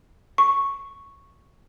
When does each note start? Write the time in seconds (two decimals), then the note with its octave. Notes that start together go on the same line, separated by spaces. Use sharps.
0.38 C#6